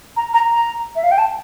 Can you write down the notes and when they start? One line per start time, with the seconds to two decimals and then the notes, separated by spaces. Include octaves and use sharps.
0.17 A#5
0.34 A#5
0.50 A#5
0.96 E5
1.04 F5
1.11 G5
1.18 A5